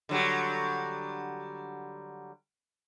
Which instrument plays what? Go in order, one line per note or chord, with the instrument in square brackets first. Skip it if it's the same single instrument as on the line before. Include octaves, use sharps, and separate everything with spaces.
[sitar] D3 F#3 G3